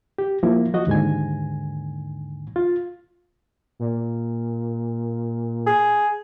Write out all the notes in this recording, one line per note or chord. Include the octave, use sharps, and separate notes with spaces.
G4
F3 A#3 E4
F3 F#4 D#5
D#2 G#2 D3 G#5
F4
A#2
G#4